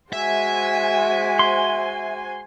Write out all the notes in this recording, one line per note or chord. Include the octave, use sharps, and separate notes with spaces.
G#3 F#4 C5 E5 G#5
C6